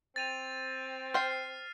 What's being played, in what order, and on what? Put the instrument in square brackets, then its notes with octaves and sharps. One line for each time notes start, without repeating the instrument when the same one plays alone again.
[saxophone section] C4 [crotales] A6 D#7 F7
[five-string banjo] C5 G5 [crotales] F6 C7